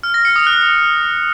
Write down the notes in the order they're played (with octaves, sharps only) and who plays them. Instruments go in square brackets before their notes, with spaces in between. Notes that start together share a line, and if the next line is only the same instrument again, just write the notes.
[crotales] F6
A#6
C#7
D#6
F#6